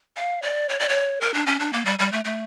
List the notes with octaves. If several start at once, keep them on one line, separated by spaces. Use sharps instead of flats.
F5
D5
C#5
D5
C#5
A#4
D4
C#4
D4
A#3
G3
G3
A3
A3